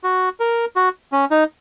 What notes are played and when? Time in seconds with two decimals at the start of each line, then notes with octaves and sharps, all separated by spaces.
0.04 F#4
0.40 A#4
0.76 F#4
1.12 C#4
1.31 D#4